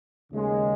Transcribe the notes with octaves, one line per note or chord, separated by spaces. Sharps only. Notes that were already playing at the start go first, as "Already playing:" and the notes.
D#2 C#3 G#3